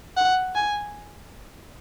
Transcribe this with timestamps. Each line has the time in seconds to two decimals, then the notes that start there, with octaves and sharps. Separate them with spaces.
0.17 F#5
0.55 G#5